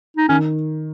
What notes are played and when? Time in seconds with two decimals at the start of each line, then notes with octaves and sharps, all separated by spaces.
0.17 D#4
0.28 D#3 C#4